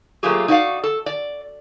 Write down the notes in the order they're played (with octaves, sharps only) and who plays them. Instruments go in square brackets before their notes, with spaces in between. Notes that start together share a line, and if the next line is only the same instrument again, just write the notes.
[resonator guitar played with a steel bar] F#3 A3 A#3 F4 G4 G#4
D#4 E4 F#4 A#4 D5 F5
A4
D5